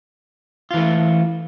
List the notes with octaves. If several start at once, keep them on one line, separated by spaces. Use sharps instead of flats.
E3 A3 F4